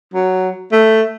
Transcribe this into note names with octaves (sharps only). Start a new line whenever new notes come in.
F#3
A3